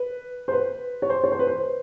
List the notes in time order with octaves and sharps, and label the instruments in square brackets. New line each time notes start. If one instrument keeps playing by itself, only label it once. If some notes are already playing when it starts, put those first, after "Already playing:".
Already playing: [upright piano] B4
C5
B4
C#5
C5
C#5
C5
B4
C5